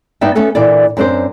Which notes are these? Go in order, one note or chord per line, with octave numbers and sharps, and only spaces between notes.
G2 B3 D#4 D5 E5 G5
A3 B3 C#4 A4 B4
A#2 E3 D4 A4 D5
F#2 C4 D4 A#4 C5